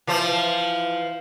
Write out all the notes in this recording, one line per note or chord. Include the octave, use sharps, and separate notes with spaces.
E3 F3 C5